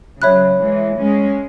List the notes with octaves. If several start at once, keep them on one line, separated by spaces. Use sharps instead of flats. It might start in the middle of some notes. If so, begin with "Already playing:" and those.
C#3 F#3 C#5 E5 B5 F#6
E3 G#3
G#3 C#4